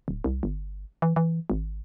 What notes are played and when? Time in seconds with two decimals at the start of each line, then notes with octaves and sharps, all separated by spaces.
0.08 D1
0.24 C2
0.43 G1
1.02 E3
1.16 E3
1.50 G#1